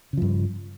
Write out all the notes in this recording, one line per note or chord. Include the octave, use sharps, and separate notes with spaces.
G2 C#3 F3